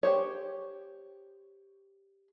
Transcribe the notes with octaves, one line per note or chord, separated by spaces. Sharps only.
G4 C5 C#5